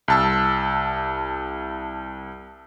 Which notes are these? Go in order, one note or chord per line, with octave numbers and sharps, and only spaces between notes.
C2 A5 E6